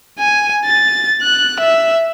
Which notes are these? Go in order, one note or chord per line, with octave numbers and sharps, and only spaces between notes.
G#5
A6
F#6
E5